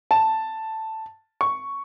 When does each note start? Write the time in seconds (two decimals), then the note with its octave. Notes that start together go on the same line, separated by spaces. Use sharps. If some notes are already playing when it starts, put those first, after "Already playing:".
0.11 A5
1.41 C#6